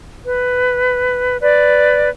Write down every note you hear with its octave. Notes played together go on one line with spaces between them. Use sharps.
B4
B4 D5